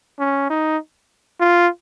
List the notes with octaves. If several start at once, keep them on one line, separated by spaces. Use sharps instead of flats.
C#4
D#4
F4